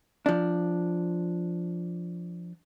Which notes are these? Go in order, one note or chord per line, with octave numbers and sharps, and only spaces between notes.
F3 D4